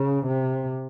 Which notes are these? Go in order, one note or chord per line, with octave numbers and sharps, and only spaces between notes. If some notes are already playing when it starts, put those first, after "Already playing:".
Already playing: C#3
C3